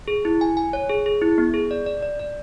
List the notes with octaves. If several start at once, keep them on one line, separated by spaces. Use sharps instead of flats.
G#4
E4
G#5
G#5
C#5
G#4
G#4
E4
B3
G#4
D5
D5
D5
D5